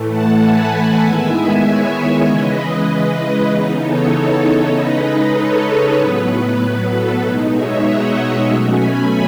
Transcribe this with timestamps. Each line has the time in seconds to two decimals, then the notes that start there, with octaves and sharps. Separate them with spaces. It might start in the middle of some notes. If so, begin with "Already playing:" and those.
Already playing: A2 E3 A3
0.09 F#5 A5
0.39 G#5 B5
0.71 F#5 A5
1.01 D#3 G#3 B3 E4 E5 G#5
1.63 C#5 E5
2.25 C#3 E3 G#3 B4 D#5
2.87 B4
3.48 C#3 E3 B3 D#4 B4
3.79 A4 C#5
4.41 A4 C#5
4.72 C#3 G#3 D#4 B4 D#5
5.33 A4 C#5
5.95 A2 F#3 B3 B4
6.88 A4
7.18 B2 G#3 D#4 B4
7.49 C#5 E5
7.80 D#5 F#5
8.41 B2 F#3 A3 C#4 E5 G#5
8.73 G#5 B5